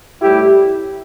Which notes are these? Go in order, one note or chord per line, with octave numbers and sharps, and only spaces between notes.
A2 G3 E4 G4